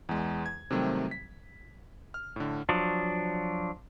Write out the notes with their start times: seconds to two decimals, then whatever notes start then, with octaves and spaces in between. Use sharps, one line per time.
0.09 E2 G#3
0.46 G#6
0.71 C3 D#3 F#3 G3 A3 C4
1.11 B6
2.14 F6
2.36 A2 D3
2.69 F3 F#3 D4